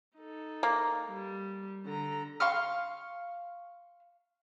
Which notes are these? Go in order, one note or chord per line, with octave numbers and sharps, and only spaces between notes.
D#4 A4
A#3
G3
D3 A#5
F5 C6 C#6 F6